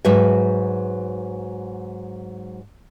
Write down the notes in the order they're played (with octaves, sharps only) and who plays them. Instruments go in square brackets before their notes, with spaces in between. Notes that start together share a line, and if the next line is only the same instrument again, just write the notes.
[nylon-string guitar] G#2 F#3 F#4 B4 E5